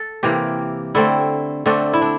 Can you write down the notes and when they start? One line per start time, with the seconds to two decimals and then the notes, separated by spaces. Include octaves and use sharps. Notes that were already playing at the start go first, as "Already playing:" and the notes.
Already playing: A4
0.23 C3 E3 A#3 G4
0.95 D3 A3 C4 E4
1.66 D3 A3 C4 D4
1.93 E4
2.02 D4